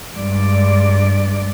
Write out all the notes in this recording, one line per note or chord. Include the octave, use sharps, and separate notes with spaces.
G2 G#3 D5